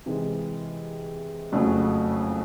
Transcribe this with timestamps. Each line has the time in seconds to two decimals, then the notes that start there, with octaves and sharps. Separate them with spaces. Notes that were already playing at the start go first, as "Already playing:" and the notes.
0.06 C3 E3 G#3
1.52 F#1 F2 C#3 F#3 A3